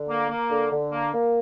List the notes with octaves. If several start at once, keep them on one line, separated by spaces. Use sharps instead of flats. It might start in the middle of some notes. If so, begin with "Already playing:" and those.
Already playing: D3
A#3
A#3
D3
D3
A#3
A#3